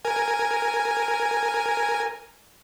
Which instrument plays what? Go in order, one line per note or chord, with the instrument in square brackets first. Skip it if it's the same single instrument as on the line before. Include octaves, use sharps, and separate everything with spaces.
[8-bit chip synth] A#4 G#5